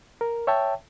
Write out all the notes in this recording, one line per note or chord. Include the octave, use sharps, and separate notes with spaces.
A#4
C#5 E5 G5 A5